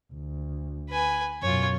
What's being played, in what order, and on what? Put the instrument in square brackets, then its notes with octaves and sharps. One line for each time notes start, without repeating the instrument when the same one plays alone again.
[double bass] D2
[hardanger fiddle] B4 G#5
[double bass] B1 F#2 [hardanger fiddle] F4 C#5